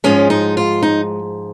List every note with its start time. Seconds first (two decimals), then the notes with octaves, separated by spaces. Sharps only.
0.04 G#2 F3 G#3 C#4
0.30 D#4
0.57 F4
0.82 D#4